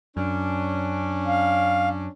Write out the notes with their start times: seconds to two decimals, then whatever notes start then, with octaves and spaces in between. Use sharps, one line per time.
0.17 F#2 C#4 D4
1.27 F5